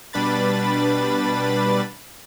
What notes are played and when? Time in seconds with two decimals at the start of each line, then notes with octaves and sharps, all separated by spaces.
0.13 B2 G3 D4 B4 B5 A6